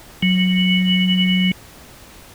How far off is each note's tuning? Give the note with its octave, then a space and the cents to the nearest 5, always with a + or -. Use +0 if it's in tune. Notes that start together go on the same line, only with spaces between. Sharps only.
F#3 -5